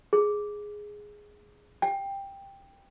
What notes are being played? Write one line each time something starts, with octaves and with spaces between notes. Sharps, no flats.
G#4
G5